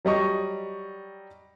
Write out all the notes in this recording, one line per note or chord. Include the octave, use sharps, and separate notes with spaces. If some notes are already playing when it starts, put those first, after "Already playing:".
F#3 G3 D#5 C#6